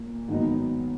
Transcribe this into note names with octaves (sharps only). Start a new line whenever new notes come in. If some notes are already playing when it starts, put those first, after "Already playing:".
Already playing: A#2 A#3
G#2 D#3 F#3 B3 D#4